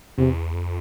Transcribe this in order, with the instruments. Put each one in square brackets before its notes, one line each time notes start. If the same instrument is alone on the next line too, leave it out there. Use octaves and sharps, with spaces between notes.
[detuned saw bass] E2 [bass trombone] C3
[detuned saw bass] F2